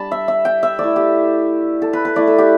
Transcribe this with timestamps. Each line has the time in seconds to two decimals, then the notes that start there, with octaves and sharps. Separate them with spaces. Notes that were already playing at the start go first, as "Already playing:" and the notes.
Already playing: G3 D4 A5 B5
0.11 E5
0.28 E5
0.45 G5
0.63 E5
0.79 A3 D5
0.84 E4
0.96 G4
1.82 A4
1.93 B4
2.05 B4
2.16 A3 E4 D5
2.27 A4
2.38 G4